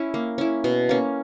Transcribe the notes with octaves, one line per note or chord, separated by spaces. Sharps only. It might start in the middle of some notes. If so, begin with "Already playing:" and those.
Already playing: C#4 E4
A#3
C#4 E4
B2
A#3 C#4